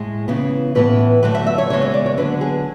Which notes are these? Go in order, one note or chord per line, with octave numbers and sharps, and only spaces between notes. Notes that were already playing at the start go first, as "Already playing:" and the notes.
Already playing: A2 G#3
C#3 E3 B3
A2 E3 B3 B4
D3 F#3 A3 B4
E5
E5
C#5
C#3 E3 G#3 B3 C#5
D5
D5
C#5
D3 F#3 B3 B4
G#4